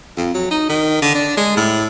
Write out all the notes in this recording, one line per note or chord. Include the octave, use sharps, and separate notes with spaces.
F2
F#3
D#4
D#3
D3
D4
G#3
A2